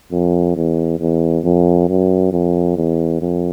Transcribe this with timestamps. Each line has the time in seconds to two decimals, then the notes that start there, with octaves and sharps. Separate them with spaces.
0.12 F2
0.56 E2
0.99 E2
1.44 F2
1.89 F#2
2.32 F2
2.77 E2
3.21 F2